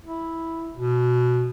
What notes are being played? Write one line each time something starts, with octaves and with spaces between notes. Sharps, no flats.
E4
B2